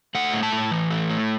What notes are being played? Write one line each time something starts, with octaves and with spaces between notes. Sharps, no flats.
A3 F#5
A2
A5
A2
E3
A3
A2